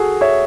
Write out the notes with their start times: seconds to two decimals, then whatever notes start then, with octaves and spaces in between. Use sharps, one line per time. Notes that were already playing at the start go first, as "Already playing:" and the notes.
Already playing: F#4 G#4 A4
0.21 C#5 E5